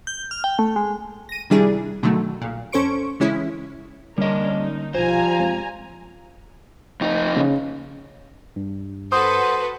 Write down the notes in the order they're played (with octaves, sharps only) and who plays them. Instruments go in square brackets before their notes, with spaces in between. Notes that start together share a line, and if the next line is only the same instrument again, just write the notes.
[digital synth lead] G6
F6
G5
A3
G#3
[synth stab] A#6 D#7
C3 D#3 G3 D4 E4 G#4
B2 D3 D#3 F#3 A3
B1 A#2
F2 C#4 A4 C5 C#6 D7
C#3 E3 G#3 C#4 E4
[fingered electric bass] D3 A#3 [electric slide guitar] G3 D#5 [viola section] C#4 D4 A#4
[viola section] D#4
[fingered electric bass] A#1 B2 [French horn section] F3 F4 [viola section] G3 G#5 A#5 [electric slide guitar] C5
[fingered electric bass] F#1 G#3 C4
[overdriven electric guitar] F2 D#4
[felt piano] C#3
[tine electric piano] G2
[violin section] F#4 A4 B4 [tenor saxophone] C5 [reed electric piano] D#6